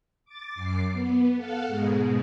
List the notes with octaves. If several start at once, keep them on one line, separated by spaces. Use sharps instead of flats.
D6 A6
F#2 D6 C7
B3
A4 F5 F#5
G#2 B2 G#3